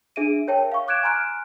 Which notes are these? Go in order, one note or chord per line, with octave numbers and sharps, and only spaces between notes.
D4 G#4 E5 D7 D#7
A#4 C#5 E5 G5 A5
F5 C#6
D6 F#6 G#6 D7 E7
G#5 A#5 C6 F6 F#6 D7